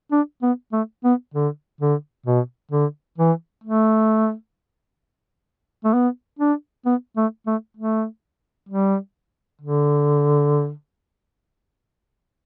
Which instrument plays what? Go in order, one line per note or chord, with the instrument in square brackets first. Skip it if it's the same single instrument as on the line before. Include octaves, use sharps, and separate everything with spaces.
[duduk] D4
B3
A3
B3
D3
D3
B2
D3
E3
A3
A3
B3
D4
B3
A3
A3
A3
G3
D3